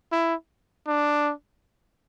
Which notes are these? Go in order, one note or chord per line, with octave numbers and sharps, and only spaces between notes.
E4
D4